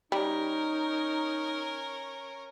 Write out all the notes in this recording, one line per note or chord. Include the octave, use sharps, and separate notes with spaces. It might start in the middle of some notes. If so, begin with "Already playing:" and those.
G3 C#4 D#4 A#4